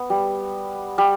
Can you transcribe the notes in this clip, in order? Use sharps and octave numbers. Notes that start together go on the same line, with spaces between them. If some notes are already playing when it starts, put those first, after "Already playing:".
Already playing: B3
G3
G3